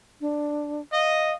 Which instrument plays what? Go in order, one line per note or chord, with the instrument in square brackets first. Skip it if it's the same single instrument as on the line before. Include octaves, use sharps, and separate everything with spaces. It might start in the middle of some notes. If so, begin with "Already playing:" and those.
[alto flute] D4
[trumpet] D#5 [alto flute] F5